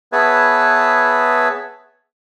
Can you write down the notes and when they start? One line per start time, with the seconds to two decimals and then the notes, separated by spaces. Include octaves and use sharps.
0.12 B3 G#4 B4 C#5 E5 A5